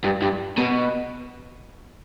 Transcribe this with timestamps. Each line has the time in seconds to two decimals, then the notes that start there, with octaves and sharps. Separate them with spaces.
0.04 G2
0.22 G2
0.58 B2